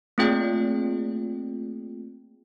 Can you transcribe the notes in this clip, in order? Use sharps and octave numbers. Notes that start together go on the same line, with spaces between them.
A3 A#3 C4 F4 G#4 G5